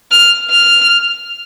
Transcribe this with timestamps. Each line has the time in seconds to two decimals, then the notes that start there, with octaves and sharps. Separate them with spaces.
0.11 F6
0.51 F6